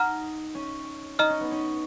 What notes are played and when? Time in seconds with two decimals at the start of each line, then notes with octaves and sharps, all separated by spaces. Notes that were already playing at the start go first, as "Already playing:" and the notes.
Already playing: D#4 F#5 A#5 F6
0.55 C#4
1.19 D#4 D#5 A#5 F6
1.30 C#4
1.40 B3
1.51 C#4